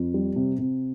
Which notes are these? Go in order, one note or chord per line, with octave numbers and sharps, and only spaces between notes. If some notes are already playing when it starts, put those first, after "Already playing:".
Already playing: F2
G3
C3
C3